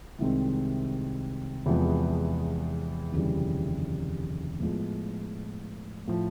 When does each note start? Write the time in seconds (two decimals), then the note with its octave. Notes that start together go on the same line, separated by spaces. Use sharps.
0.19 C2 C3 D#3 G#3 C4
1.66 E2 C3 F3 G#3 B3
3.13 F1 D#2 C#3 E3 G3
4.60 A2 F3 G#3 B3
6.08 A2 F3